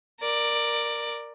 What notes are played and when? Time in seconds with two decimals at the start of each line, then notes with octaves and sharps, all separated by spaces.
0.21 A#4 D5